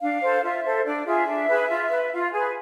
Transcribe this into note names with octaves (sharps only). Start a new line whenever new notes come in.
D4 F5
A4 C5
F4 E5
A4 C5
D4 D5
F4 G#4 E5
D4
G#4 B4
F4
B4
F4 F5
G#4 B4 G#5